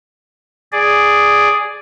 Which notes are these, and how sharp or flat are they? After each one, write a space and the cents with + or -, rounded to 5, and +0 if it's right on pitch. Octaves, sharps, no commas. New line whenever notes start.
G#4 +0 D5 +0